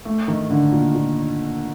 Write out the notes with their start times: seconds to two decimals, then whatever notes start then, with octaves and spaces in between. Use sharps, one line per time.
0.05 A3
0.28 D#3
0.50 D3
0.72 A#2
0.95 A#2